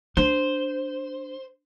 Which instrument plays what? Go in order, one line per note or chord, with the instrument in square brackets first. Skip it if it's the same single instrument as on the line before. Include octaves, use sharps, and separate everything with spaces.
[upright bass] D4 [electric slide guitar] C5